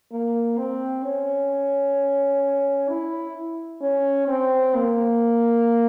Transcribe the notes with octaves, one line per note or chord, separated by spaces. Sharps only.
A#3
C4
C#4
E4
C#4
C4
A#3